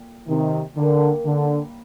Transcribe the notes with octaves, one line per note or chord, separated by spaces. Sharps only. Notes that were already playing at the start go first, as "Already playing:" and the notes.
Already playing: A#2 G3 A4
C3 D#3
F#2 D3 D#3 G3 A#3
D3